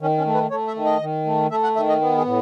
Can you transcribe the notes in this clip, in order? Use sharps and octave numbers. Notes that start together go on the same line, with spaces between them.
D#3 C#4
C#4
A3
B4
A3 C#5
E5
D#3
D#5
D#3
A3
A3 E5
F#5
D#3 E5
D#5
B3
G#4
A2